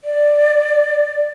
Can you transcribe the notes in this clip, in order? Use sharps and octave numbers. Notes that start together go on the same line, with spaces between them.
D5